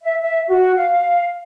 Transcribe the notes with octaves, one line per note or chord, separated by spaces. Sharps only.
E5
E5
F#4
F5